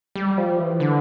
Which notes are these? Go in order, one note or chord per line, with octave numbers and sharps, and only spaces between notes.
G3
F3
E3
D3